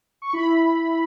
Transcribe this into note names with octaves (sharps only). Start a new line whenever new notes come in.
C#6
E4 B5